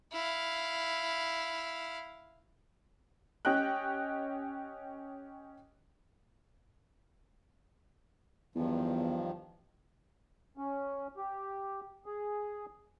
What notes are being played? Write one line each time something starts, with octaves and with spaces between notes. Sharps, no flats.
E4 F5
C#4 G4 D#5 G5 F#6
E2 G2 D#3 F3
C#4
G4
G#4